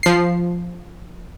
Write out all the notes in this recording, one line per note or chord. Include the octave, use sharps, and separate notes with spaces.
F3 C7